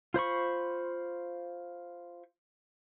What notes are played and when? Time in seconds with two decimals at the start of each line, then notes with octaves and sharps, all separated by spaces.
0.14 F4 C5 B5 C#6